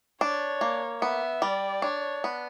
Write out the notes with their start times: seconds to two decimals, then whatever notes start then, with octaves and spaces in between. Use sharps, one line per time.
0.21 D4 C#5
0.61 A#3
1.01 B3 E5
1.42 G3 D5
1.82 D4 C#5
2.24 B3